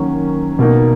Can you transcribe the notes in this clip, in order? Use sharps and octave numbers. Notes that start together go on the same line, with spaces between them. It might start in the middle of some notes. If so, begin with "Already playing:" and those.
Already playing: D#3 F#3 A#3 C#4
B2 A#3 D#4